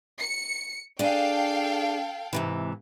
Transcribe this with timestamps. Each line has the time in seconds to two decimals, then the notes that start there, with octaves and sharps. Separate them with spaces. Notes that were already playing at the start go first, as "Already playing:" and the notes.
0.20 C#7
0.99 D4 G#4 A4 F5 G5
2.33 G#2 C3 E3